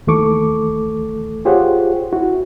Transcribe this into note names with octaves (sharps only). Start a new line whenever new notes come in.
D#2 E3 A3 A4 C#6 D6
F4 G4 G#4 C5 C#5 F#5
E4 F#4